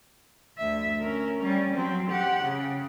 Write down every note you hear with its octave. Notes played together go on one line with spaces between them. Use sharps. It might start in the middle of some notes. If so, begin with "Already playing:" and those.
D2 E5
C#4 A#4
G3 C#4
F#3 C4
G4 F#5
C#3